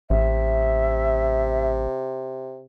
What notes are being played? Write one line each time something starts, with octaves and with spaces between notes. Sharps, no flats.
A1 C3 E5